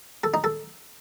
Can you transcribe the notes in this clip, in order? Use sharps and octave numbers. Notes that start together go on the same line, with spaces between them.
A4
D#4
A4